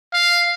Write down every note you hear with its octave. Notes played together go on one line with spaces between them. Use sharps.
F5